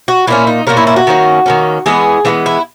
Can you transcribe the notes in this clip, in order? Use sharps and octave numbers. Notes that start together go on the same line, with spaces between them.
F#4
A#2 A#3 C#4 E4
D#4
A#2 A#3 C#4 A#4
E4
E4
F#4
D#3 A#3 C#4
D#3 A#3 C#4
E3 G#3 B3 G#4
E3 G#3 B3 F#4
E4